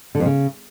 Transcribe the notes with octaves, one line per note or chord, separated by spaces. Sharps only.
D3
F2
C#3